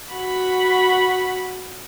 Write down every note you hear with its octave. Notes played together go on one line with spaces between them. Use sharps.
F#4 B5